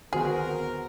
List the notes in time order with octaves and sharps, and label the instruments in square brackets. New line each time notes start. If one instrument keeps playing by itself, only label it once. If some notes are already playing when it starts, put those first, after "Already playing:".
[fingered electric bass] D2 D#3 [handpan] B3 F#4 C5 [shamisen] G#4 [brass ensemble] A#4